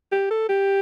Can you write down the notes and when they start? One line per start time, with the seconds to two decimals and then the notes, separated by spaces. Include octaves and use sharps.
0.12 G4
0.31 A4
0.49 G4